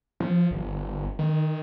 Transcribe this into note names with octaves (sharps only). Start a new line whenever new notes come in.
F3
G1
D#3